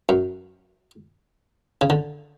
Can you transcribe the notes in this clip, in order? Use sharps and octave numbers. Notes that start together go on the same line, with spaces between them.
F#2
C#3
D3